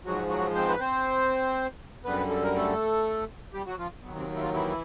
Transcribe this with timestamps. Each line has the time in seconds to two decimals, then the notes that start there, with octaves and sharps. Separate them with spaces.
0.05 G#2 F3 F#3 G#3 F#4
0.30 F#3 F#4
0.55 C4 C5
0.69 B4
0.80 C4 C5
2.04 F#2 D3 G3 B3 B4
2.30 A4
2.43 A#4
2.56 A3 A4
3.53 G3 G4
3.66 F#3 F#4
3.78 F3 F4
4.03 D#2 D#3 F#3 B3
4.16 C3 C4
4.35 E4
4.41 F3 F4
4.53 E3 E4